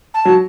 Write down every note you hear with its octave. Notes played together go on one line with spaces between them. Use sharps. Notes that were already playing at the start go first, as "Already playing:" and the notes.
A5
F#3